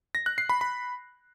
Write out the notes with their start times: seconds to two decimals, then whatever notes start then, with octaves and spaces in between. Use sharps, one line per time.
0.15 A#6
0.26 F#6
0.38 C7
0.49 B5
0.61 B5